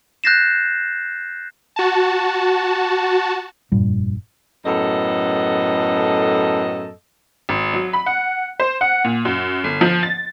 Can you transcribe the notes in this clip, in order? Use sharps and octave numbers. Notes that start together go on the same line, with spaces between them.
F#6 G6 A6 A#6 C7 E7
F#4 A5
F1 G2 A#2 G3
F#2 A2 B3 A4 D#5
G#1
F#3
B5
F#5
C5
F#5
A#2
F#2
G1
F3
A6